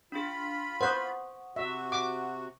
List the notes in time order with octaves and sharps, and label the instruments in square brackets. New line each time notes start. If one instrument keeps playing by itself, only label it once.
[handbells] D4 G#4 [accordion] F4 B5
[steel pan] B4 C5 [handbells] F#5 C#6 D#6
[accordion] C3 F#4 [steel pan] E5
[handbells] F#5 [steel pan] D6